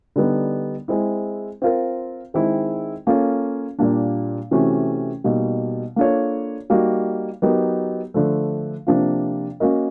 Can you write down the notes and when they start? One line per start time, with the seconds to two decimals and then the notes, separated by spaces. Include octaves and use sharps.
0.16 D3 G3 B3 D#4
0.88 G#3 C4 E4
1.62 C4 F4 A#4
2.34 D#3 G#3 C4 E4
3.07 A#3 C#4 F4 A4 C#5
3.79 A#2 G3 A#3 D4
4.51 C3 E3 A3 C#4 F#4
5.24 B2 G3 A#3 D#4
5.96 A#3 D4 F4 A4 C#5
6.70 G3 A#3 D#4 F#4
7.42 F#3 B3 D#4 G4 A#4
8.14 D3 F3 A3
8.87 C3 F3 A#3 D4 F4
9.60 A#3 C#4 F#4 A#4 D#5